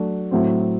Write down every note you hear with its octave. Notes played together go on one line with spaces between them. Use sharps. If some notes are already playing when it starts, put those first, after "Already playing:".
Already playing: F#3 A3 D4 F#4
A2 F#3 C4